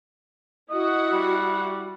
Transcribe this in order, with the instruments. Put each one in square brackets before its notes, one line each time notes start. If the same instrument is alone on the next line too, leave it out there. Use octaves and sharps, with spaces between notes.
[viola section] E4 F#4 F#5 [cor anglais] D#5
[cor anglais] G3